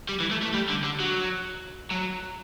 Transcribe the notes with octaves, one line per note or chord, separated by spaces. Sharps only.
G3
E3
A3
A3
G3
D3
D3
F#3
F#3